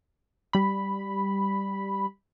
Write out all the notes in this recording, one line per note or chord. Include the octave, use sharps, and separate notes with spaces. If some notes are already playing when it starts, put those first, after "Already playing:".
G3 B5